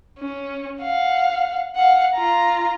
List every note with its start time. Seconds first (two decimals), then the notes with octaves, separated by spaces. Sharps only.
0.19 C#4
0.82 F5 F#5
1.75 F5 F#5
2.15 F4 A#5